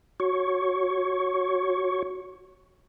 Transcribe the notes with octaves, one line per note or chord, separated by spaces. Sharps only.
F#4 C#5 C#6